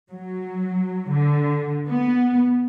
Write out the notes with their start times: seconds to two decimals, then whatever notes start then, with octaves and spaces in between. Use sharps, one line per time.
0.11 F#3
1.09 D3
1.88 B3